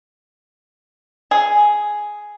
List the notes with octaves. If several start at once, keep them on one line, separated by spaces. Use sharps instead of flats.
G#4